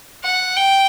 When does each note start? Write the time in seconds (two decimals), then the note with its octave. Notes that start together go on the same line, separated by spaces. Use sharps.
0.23 F#5
0.56 G5